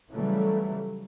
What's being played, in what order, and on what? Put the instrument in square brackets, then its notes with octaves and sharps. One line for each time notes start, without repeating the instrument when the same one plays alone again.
[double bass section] C#3 E3 F#3 G3 A3